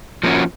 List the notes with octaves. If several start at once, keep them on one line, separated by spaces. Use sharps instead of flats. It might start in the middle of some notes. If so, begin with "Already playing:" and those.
F3 A#3 C#4 F#4